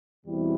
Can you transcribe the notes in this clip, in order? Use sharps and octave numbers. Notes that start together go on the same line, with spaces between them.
E2 B2 G3 C4 E4